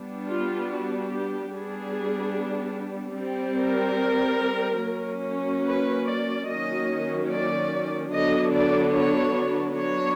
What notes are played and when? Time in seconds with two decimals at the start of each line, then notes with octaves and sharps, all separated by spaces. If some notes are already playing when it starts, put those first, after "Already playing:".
Already playing: G3 B3 D4
0.28 F4
0.69 F#4
1.10 G4
1.52 G3 B3 D4 G#4
3.17 G3 C4
3.58 A#4
4.82 F#3 A#3 C#4
5.64 B4
6.06 D5
6.47 D#3 F#3 A#3 C#4 D#5
7.30 D5
8.12 D3 F#3 B3 D4 D#5
8.54 D5
8.95 C#5
9.77 F#3 B3 D4 C#5